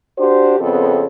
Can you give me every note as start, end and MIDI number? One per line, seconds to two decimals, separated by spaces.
0.18 0.59 62
0.18 0.59 66
0.18 0.59 67
0.18 0.59 72
0.60 1.07 41
0.60 1.07 49
0.60 1.07 59
0.60 1.07 60
0.60 1.07 69